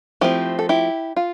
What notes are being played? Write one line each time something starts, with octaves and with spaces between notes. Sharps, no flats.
F3 A3 C4 E4 G4
A4
E4 G4
F4